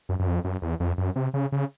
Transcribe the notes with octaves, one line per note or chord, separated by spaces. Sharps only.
F#2
F#2
F2
F#2
E2
F2
F#2
C3
C#3
C#3